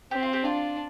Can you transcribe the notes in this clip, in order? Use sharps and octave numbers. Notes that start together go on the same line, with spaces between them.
C4 G4
F4
G4
D4 F4